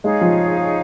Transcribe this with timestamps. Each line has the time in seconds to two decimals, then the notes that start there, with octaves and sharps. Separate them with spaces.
0.03 G#3 D#4 G#4 C#5 F5
0.21 F3